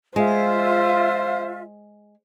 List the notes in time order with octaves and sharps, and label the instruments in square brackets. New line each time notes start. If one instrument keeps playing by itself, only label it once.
[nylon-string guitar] G#3 [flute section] F4 E5 [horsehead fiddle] C5